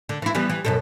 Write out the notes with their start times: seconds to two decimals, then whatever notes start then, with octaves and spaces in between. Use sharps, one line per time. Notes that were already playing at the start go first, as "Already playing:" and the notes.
0.09 D3
0.22 E3 E4
0.35 E3 G3 B3
0.50 E3
0.65 F#2 B2 A4